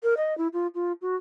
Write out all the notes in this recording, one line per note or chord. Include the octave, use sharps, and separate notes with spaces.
A#4
D#5
E4
F4
F4
F#4